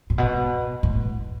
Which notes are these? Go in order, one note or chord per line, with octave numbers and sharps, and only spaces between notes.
A2
B2
A2